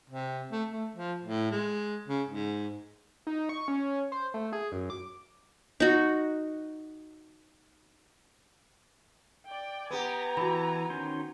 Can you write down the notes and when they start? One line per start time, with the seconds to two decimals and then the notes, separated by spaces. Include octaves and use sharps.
0.10 C3
0.52 A3
0.71 A3
0.96 F3
1.25 A2
1.51 G#3
2.08 C#3
2.29 G#2
3.27 D#4
3.49 C#6
3.68 C#4
4.12 C5
4.34 A3
4.53 G#4
4.72 F#2
4.90 D6
5.80 D#4 F#4
9.46 D5 G5
9.91 B3 G4 G#5 A#5
10.37 E3 F#4 B5
10.90 D#3 C#4 C5